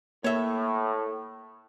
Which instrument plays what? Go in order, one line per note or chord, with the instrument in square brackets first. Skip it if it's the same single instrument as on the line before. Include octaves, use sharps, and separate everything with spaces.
[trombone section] A2 [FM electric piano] A#3 [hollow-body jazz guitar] C#5 E5